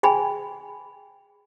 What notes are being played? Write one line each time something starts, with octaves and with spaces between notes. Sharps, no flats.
G#4 G5 G#5 B5